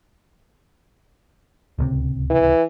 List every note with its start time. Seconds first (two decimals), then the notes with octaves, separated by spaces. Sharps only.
1.79 D1 C#2 C3
2.30 E3